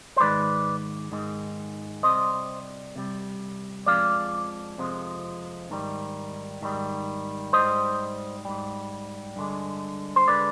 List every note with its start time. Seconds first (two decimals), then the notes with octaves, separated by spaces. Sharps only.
0.16 C5
0.20 G#2 D#3 G#3 B4 D5
1.12 G#2 D#3 G#3
2.03 C3 G3 C5 D#5
2.96 C3 G3
3.86 F2 C3 F3 G#3 D5 F5
4.78 F2 C3 F3 G#3
5.70 G#2 D#3 G3
6.62 G#2 D#3 G3
7.53 G#2 G3 C5 D#5
8.45 G#2 G3
9.36 G2 D3 G#3
10.16 C5
10.27 D3 G#3 B4 D5